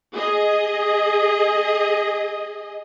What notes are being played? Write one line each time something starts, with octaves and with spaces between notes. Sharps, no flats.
G#4 D#5